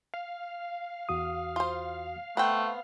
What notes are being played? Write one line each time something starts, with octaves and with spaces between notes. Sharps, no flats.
F5
E2 F#4 D#6
F4 C5
A3 B3 C4 G5